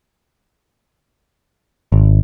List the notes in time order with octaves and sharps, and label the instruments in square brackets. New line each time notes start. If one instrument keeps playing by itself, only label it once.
[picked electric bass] G#1